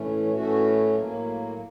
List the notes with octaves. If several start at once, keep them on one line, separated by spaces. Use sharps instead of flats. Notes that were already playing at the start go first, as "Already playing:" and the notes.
Already playing: A2 E3 A3 C#4
A2 E3 A3 C#4 F#4
A2 F#3 A#3